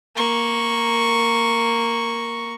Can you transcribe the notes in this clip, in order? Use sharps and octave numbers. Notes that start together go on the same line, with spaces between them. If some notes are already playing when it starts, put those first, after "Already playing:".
A#3 C#6